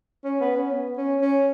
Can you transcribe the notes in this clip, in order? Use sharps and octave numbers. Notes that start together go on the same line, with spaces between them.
C#4
B3
C#4
B3
C#4
C#4